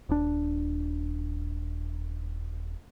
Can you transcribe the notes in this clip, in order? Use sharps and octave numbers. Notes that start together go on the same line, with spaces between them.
D#1 D4